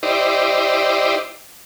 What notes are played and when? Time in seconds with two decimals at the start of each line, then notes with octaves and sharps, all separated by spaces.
0.03 E4 G4 C5 D5 D#5